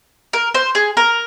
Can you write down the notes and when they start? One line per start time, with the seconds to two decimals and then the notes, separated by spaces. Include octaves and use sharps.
0.33 A#4
0.54 C5
0.75 G#4
0.97 A#4